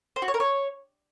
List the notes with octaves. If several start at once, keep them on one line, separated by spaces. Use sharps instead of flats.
C5
F#4
C#5
A#4
C#5